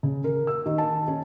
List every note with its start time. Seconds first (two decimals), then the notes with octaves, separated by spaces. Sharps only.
0.03 C#3
0.24 A#4
0.47 E6
0.66 D#3
0.78 A5
1.08 C#4